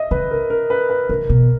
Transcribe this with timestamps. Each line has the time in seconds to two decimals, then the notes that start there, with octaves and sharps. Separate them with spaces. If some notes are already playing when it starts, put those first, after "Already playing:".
Already playing: D#5 E5
0.11 C#3 B4
0.31 A#4
0.50 A#4
0.70 B4
0.90 B4
1.09 C#3 A#4
1.29 B2